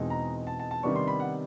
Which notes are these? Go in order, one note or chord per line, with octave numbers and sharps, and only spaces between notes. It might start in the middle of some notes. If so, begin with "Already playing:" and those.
Already playing: E2 B2 G#3 C4 D#4
A#5
A5
A5
A5
C3 D#3 G3 B3 D4 C#6
C6
B5
F#5